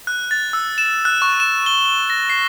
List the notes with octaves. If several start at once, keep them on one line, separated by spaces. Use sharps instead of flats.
F#6
A6
E6
E7
F#6
C#6
E7
G7
A#6
C7